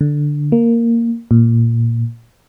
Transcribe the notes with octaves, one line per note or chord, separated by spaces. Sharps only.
D3
A#3
A#2